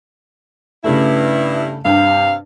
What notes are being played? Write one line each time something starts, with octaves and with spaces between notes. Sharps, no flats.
G2 C#3 A3 E4
G2 C3 G4 F5